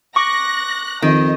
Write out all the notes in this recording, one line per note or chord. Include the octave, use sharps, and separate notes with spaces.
C#6 D6 F#6 A#6
F2 D#3 D#5